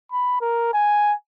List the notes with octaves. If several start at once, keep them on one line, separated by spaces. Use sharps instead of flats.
B5
A#4
G#5